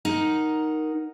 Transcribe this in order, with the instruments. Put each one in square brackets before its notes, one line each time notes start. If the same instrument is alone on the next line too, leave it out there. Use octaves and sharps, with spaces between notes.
[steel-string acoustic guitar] D#4 A#4 F#5